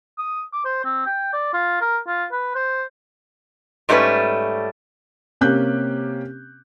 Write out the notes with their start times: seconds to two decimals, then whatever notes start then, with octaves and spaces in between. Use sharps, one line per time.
0.18 D#6
0.53 D6
0.65 C5
0.84 C4
1.06 G5
1.33 D5
1.53 F4
1.81 A#4
2.07 F4
2.32 B4
2.55 C5
3.89 G#2 G3 A3 C#4 B4
5.41 C3 A#3 C#4 G4 F#6 G6